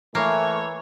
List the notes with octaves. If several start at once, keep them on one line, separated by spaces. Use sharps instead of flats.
E3 A3 A#3 C#5